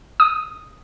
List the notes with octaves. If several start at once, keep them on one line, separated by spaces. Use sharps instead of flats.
D#6